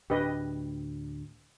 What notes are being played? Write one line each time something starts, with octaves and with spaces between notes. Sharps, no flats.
D2 A2 D4 G4 B4 D#5